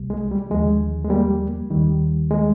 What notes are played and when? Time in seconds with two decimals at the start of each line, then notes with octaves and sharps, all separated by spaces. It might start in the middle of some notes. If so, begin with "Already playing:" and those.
Already playing: C2 C3 G3
0.10 G#3
0.31 G3
0.50 D#2 D3 F3 G#3
1.05 G#3
1.10 G3 A#3
1.70 D#2 D#3 G3
2.31 G#3